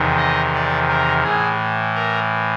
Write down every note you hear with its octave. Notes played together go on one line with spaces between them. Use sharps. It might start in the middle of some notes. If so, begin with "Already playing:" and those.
Already playing: E2 C3 D#3
D#5
D5
A#4
A2 E3 G#4
A#4